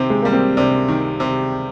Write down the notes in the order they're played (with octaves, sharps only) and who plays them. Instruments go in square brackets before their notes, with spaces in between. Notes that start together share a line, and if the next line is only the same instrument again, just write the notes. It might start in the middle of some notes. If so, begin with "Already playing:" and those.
Already playing: [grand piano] C3 D#3 [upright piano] C4
[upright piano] G#3
[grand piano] G3 [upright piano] A#3
[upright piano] C4
[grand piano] C3 [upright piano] D4
[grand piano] D#3
C3